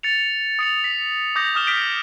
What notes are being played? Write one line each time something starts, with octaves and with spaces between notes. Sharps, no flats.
A6 C#7 F7
D#6 C#7 F7
B6
D6 D#6 G6 A#6
D#6 F6 E7 G7
F6 B6 D7